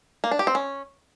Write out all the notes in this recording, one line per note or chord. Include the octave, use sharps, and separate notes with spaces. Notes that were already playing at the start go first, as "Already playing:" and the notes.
A#3
D4
G4
C4
C#4